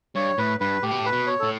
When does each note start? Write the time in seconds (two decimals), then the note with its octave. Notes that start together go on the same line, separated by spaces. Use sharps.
0.15 G2 C#5
0.38 A2 B4
0.60 G2 B4
0.83 A2 G4
0.91 B2
0.99 A2
1.05 B4
1.12 B2
1.27 C#5
1.40 A2 A4